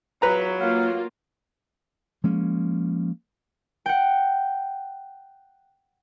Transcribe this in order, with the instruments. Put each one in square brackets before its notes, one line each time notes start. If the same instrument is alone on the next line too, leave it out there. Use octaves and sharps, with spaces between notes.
[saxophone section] E2 F4 C#5 [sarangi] F#3 [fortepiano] B4 A#5
[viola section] A#3 F4 [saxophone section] F5 F#5
[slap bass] F3 G#3 A#3 C#4
[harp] F#5 G5